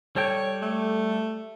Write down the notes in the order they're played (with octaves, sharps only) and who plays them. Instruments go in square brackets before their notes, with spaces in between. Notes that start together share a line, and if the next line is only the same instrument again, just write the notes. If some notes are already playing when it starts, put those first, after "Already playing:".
[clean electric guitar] G3 A4 G5 [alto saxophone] C#5
[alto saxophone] A3